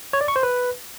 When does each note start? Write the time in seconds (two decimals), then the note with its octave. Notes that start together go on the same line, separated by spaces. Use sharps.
0.13 C#5
0.21 D5
0.28 C#6
0.36 C5
0.43 B4